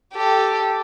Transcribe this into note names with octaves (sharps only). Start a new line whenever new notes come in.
G4 A4